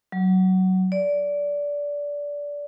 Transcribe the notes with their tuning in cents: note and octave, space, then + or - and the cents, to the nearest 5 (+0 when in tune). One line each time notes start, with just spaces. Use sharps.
F#3 +15
D5 -20